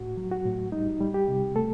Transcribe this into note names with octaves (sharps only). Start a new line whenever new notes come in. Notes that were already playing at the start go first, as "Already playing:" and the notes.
Already playing: A2 F#4
F#3
F#4
A2
G3 D#4
G3
G4
C3
A3 A4